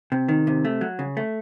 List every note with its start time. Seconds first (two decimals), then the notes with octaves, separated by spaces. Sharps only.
0.12 C3
0.28 D#3
0.47 C3
0.65 A3
0.81 F#3
0.99 C#3
1.17 A3